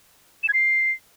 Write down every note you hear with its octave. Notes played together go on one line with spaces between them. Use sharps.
E7
G#6
C7